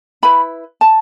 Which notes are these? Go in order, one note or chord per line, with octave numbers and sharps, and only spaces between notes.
E4 B4 B5
A5